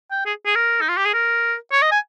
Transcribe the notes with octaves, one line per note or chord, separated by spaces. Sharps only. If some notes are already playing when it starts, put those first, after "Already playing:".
G5
G#4
G#4
A#4
D#4
F4
G4
G#4
A#4
C#5
D#5
G#5